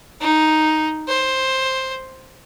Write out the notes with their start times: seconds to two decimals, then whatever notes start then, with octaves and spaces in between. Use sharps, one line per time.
0.20 D#4
1.08 C5